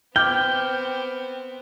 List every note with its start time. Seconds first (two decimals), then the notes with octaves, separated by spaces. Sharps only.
0.16 B3 C4 G5 D6 F6 G6